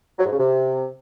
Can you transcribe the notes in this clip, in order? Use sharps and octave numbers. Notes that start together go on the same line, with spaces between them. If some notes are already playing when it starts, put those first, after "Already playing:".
F#3
G#2
C#3
C3